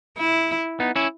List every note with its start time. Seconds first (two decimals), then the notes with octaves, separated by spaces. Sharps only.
0.18 E4
0.80 B3 D#4
0.96 C#4 E4